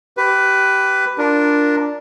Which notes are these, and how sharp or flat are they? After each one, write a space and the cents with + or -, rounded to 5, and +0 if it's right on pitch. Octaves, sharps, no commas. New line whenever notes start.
G4 -20 B4 +10
D4 +0 F4 +0 A#4 +0